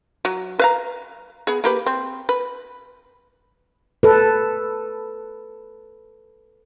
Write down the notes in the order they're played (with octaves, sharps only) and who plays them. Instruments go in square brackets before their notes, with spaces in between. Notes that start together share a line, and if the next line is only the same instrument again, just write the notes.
[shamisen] F#3
B4 F5 A#5
B3 G#4
A#3 G4 B4
C4
B4
[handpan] A4 B4